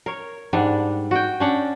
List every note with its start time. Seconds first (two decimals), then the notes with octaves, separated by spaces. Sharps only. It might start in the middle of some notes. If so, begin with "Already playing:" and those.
0.06 A#4 C#5
0.53 G#2 G3 D4 F#5
1.11 F#4 G5
1.40 C#4 D4 F#5 G5